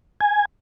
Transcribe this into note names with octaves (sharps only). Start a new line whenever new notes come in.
G#5